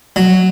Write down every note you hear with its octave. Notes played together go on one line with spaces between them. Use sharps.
F#3